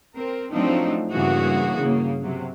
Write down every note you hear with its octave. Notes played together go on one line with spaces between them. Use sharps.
C4 A#4
F3 F#3 A3 C4 D4 D#4
G2 C#3 E3 A#3 F#4 G#4
C#3 A#3
C3 F#3